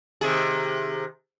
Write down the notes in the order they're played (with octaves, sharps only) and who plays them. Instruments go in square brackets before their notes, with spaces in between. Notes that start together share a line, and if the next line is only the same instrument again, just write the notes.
[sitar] C3 D#3 G#4